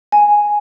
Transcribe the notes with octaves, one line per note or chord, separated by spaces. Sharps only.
G#5